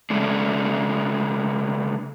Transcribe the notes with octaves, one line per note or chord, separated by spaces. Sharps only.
C#3 G#3 A3 C#4 D4